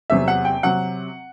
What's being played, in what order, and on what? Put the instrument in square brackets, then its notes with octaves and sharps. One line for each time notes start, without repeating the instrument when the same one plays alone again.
[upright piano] E2 C3 F#3 E5
F#5
G5
C3 F#3 F#5